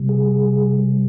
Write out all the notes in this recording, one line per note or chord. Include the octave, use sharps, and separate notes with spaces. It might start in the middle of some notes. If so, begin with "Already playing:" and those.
Already playing: C3 G3
G#4